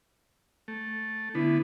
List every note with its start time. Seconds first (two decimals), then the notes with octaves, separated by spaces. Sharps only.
0.68 A3
1.35 D3 B3 E4